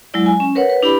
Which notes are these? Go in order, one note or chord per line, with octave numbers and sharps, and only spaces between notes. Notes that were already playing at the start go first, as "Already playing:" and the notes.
F#3 G#3 E4 D5
G#5
C#4
A#4 B4 C#5 F#5
B4
D4 E4 G4 B4 D5 B5